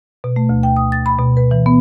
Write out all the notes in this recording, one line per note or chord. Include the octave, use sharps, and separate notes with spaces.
B2
A3
D2
G5
D#6
A6
B5
B2
B4
E3
B3